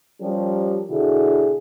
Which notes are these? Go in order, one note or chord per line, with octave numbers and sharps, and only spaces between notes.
F3 G3 C#4 G4 A#4
B2 D3 E4 F#4 G#4